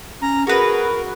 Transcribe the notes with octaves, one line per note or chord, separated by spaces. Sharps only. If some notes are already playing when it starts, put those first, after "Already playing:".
C#4 A#5
F#4 G#4 A#4 B4